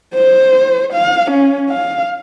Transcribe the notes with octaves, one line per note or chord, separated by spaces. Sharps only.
C5
F5
C#4
F5